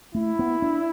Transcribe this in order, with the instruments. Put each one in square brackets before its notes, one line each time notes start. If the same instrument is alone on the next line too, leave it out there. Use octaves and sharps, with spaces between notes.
[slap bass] A3 [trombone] E4
[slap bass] B3
D4